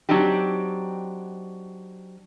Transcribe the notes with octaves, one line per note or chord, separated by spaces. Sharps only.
F#3 C4 D4 D#4 G4